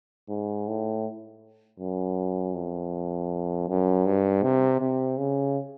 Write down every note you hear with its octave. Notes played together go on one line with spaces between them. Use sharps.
G#2
A2
F#2
F2
F#2
G2
C3
C3
C#3